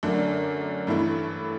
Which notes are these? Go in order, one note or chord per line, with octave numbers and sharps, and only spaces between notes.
F#2 D3 A3 D4
G2 E3 A3 E4